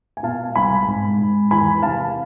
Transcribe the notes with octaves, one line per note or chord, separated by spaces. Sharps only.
G#5
B2 F5 A5
C2 G#5 B5
G#2
G#2
E2 G#5 B5
C3 F5 A5